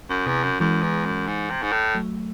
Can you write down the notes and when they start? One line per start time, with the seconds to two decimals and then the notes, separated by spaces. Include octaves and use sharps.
0.10 F#2
0.26 E2 C3
0.43 F#2
0.60 F#2 E3 G#3
0.82 E2
1.05 F#2
1.27 G#2
1.50 C3
1.62 G#2
1.72 A2
1.95 F#3 A3